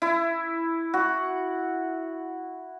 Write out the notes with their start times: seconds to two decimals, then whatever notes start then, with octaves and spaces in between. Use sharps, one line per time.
0.02 E4
0.94 F#4